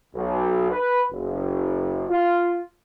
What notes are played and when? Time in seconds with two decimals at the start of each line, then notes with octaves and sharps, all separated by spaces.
0.15 B1
0.71 B4
1.12 F#1
2.10 F4